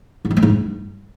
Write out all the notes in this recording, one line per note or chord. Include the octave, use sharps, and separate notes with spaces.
G#2
G3
G#3
G#2
G2